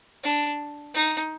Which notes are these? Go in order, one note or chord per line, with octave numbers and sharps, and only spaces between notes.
D4
D#4